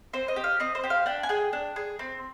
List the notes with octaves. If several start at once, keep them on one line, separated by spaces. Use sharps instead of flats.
C4 C5
D#5
G4
F5
C4 D#5
C5
G4
F5
D4 G5
G#5
G#4 G5
D4
G#4
C4